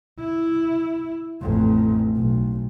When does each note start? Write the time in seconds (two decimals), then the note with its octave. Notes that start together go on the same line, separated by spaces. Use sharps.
0.19 E4
1.41 A1 F2
2.15 B1